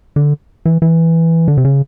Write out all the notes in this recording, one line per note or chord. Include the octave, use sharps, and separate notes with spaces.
D3
E3
E3
D3
C3
C#3